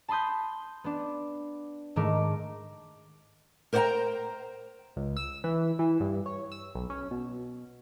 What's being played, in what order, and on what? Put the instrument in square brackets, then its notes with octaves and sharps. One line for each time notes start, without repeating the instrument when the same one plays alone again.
[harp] A5 B5 C6 D#6 G6
B3 D4
G#2 D#3 A3 A#4 D6
[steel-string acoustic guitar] A#4 C5 D5 F#5 G5 A#5
[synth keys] C#2
E6
E3
E3
G2
C#5
E6
B1
C#4
B2